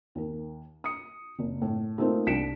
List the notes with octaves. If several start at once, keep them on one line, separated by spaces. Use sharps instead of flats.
D#2 A#4
D#6 C#7
F#1
A2
A3 A#3 C4 D#4 F4 A#4
C2 D4 B6 C#7 D7 E7